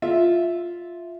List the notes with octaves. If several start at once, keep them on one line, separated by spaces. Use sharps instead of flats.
F4 E5